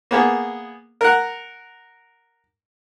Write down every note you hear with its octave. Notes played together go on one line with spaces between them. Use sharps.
A#3 B3 G#4
A#4 F#5